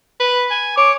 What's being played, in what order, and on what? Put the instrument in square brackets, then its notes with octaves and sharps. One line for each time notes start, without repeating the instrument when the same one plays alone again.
[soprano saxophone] B4
G#5
[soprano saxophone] C#5 [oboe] D6